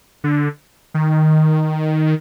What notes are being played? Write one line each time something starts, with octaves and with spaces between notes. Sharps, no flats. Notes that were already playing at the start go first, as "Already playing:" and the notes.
D3
D#3